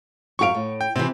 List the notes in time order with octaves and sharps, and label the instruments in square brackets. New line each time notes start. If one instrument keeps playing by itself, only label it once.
[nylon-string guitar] F#2 G4 F5 [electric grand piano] C#6 D7
[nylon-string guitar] A2
[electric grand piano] G5
[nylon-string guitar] C3 E3 [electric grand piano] C4